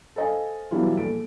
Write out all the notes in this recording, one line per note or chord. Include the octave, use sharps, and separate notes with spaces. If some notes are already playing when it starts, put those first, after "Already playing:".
A4 C5 D#5 F5 G#5
B2 E3 F#3 G3 E4 F4
A#1 A4 D7